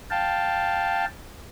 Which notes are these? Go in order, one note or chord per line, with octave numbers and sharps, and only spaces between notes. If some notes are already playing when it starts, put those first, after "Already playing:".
F5 G5 A5